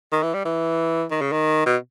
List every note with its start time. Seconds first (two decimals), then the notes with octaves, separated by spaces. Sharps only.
0.12 D#3
0.23 E3
0.34 G3
0.45 E3
1.11 D#3
1.21 C#3
1.32 D#3
1.66 B2